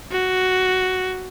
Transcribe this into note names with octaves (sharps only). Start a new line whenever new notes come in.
F#4